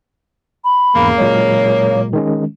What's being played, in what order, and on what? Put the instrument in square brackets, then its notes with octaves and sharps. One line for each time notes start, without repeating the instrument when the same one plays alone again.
[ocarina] B5
[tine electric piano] E2 G#2 [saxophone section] C#3 A#3
[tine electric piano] A#2 F#3 G#3 [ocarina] C#5
[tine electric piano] D#3 G#3 C#4